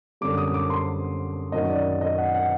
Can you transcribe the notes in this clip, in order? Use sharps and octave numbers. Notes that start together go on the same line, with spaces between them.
F#2 D3 G3 D6
D#6
D6
C6
F#2 D#3 F#3 D#5
D5
D#5
F#5
F#5